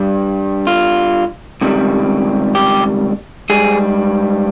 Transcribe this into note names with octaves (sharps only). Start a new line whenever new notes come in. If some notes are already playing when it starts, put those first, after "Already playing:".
Already playing: G2 G3
F4
C#2 C3 D#3 G3
G4
G#2 G3 G#4